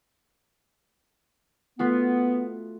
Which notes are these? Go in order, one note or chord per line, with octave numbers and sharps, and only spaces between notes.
A3 B3 F4 F#4